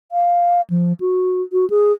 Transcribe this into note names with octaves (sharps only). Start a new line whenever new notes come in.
F5
F3
F#4
F#4
G#4